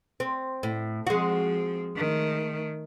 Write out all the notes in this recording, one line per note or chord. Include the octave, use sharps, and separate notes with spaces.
C4
A2
F3 G#3 C4 F#4
D#3 A3